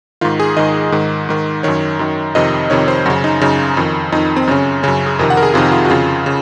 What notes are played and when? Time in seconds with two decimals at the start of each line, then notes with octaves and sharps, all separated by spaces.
0.21 G#2 D#3 F4
0.40 G#4
0.56 G#2 D#3 D#5
0.92 G#2 D#3
1.29 G#2 D#3
1.63 F#2 D#3 C#5
1.99 F#2 D#3
2.35 F2 C3 D#3 D#5
2.70 F2 C3 D#3 C#5
2.88 C5
3.06 F#2 F#4
3.10 C#3
3.24 D#4
3.41 F#2 C#3 D#4
3.77 F2 D#3
4.12 F2 D#3 D#4
4.36 C4
4.47 F#2 C#3 C#4
4.83 F#2 C#3 C#4
5.06 G#4
5.19 F2 C3 D#3 A#4
5.30 F#5
5.37 A#4
5.43 G#4
5.54 F2 C3 D#3 F4
5.72 F4
5.85 F#4
5.90 F2 C#3 F4
6.26 C#3